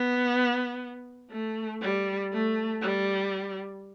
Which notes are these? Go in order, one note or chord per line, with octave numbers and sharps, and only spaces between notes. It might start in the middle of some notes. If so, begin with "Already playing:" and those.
Already playing: B3
A3
G3
A3
G3